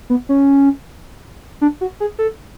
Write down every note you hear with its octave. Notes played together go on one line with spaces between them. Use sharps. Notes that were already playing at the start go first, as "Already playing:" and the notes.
B3
C#4
D4
F#4
G#4
A4